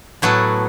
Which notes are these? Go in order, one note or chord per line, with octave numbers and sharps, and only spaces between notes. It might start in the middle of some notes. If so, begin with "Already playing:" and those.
A2 F#3 B3 F#4 A4